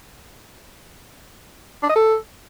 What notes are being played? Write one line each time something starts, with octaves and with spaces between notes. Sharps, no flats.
D4
D#5
A4